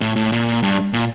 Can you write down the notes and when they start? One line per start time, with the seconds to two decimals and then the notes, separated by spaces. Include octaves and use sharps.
0.01 A2
0.16 A2
0.32 A#2
0.63 G2
0.93 A#2